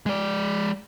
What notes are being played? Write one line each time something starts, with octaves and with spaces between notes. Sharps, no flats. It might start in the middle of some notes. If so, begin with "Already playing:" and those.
G#3 D5